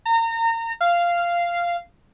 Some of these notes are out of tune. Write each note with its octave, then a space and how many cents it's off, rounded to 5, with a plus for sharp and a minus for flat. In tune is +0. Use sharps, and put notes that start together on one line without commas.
A#5 -30
F5 -10